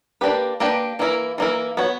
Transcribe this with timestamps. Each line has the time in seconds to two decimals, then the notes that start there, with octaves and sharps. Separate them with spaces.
0.21 A#3 D4 G4 B4
0.60 A#3 D4 G4 B4
0.99 E3 A#3 E4 A#4
1.38 E3 A#3 E4 A#4
1.77 B3 F#4 C#5